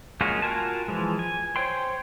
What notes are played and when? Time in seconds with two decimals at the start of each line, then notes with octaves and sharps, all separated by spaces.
0.21 G#3 A#3 C#4 F4 F#4
0.42 F4 F#4 A#4 G#5 A5
0.88 E3 F3 G#3
1.19 G#5
1.56 C5 C#5 G5 C6